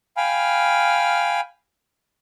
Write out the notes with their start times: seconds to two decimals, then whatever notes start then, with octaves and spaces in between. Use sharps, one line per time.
0.17 F5 G5 G#5 B5 F6